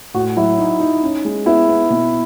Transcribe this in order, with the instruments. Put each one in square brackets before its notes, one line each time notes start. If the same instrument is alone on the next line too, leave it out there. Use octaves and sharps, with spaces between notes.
[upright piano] A2 [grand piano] F#4
[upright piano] F#3 [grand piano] E4
[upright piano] D#4
D#4
C#4
G#3
[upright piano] B3 [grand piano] E4
[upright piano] B3
B2